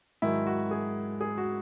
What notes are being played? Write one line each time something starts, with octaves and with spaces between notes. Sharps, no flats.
G#2 D#3 F#3 E4
F#4
G#4
G#4
F#4